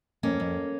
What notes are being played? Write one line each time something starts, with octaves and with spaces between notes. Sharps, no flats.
F2 A#3 C#4
F2